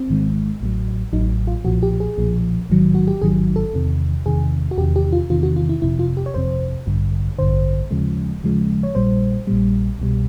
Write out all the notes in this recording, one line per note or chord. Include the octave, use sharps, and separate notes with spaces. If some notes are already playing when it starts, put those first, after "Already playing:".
Already playing: C4
G#1 G#2 D#3 G#3
A1 A2 F#3
A1 A2 F#3 D#4
F4
B1 A#2 F3 F#4
G4
G#4
B1 A#2 F3
A1 G#2 D#3 F#3
F#4
G4
A1 G#2 D#3 F#3 G#4
A4
E2 C3 D#3
E2 C3 D#3 G#4
F#4
E2 C3 D#3 G4
G4
F4
E2 C3 D#3 F4
F#4
F4
E4
G1 F2 C3 E4
F4
G4
C#5
G1 F2 C3 C5
A1 G2 D3
A1 G2 D3 C5
D#2 C#3 F3 G#3
D#2 C#3 F3 G#3
C#5
A#1 A#2 G3 C5
A#1 A#2 G3
C2 B2 G3